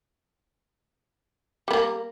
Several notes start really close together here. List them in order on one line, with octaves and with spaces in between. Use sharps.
G3 B3 A#3